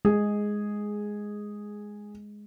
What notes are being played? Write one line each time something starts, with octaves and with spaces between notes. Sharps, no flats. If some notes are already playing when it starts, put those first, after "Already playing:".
G#3 G#4